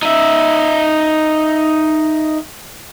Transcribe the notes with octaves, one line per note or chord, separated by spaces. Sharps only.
D#4 E5